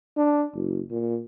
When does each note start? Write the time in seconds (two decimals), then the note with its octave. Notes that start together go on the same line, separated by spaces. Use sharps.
0.17 D4
0.55 F#1
0.91 A#2